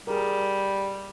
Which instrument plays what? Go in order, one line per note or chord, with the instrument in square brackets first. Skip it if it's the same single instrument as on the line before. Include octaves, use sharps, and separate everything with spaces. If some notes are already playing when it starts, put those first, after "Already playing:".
[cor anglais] G3 [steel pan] G#4 A#4